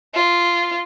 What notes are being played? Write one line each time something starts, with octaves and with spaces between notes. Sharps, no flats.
F4